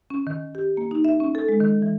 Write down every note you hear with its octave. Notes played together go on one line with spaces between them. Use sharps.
C#4
D#3
G4
A#3
D#4
E5
C#4
A4
G#3
D#3
E3